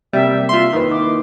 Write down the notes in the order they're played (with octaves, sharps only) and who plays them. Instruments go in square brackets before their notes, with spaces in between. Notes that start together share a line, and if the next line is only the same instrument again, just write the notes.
[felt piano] C3 A#3 [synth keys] G3 [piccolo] E5
[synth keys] F4 C6 [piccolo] E5
[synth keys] D#3 [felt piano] A#3 E4 B4
[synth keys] D#3 [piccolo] D6